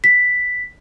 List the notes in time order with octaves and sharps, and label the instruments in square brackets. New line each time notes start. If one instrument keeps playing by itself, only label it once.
[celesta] B6